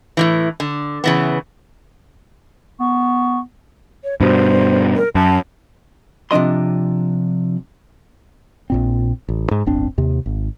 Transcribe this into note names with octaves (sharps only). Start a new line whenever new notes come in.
A2 C3 E3
D3
C#3 E3 B3
B3 C#6
C#5
G2 B2 C5
A#4
F#2 A5
C3 F3 D4 D#5 C6
A#1 A#2 C4
A1
G#2
D1 G1 C4 D4
D#2 C3
G#1